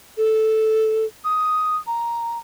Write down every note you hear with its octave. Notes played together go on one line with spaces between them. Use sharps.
A4
D#6
A#5